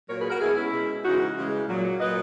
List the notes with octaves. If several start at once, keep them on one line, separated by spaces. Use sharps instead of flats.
A#2 F#3 A#4 C#5
G#4 B4
F#4 A#4
B2 G#3 E4 G#4
C#4 E4
B2 G#3
C#3 E3 G#3 D#4 F#4
C#3 E3 G#3
A#2 F#3
A#2 F#3 B4 D#5